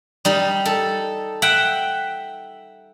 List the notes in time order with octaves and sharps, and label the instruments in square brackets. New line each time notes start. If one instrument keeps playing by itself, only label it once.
[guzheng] G3 D#4
A4
E5 F#5 G5